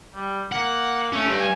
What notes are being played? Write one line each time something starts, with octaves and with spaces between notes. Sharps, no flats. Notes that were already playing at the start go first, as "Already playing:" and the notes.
G3
A#3 F#5
A3 C#4
G2 G3
G#5